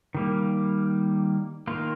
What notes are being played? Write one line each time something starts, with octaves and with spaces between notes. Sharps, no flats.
D#3 G3 A#3
D#3 A#3 F4